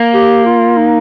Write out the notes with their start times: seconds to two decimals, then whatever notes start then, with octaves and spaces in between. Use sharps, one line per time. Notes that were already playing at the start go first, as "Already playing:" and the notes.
Already playing: A#3
0.14 G4
0.46 F4
0.77 D#4